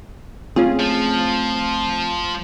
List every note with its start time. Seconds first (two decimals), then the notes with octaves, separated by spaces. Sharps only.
0.56 A3 C4 C#4 F4 G#4
0.80 F3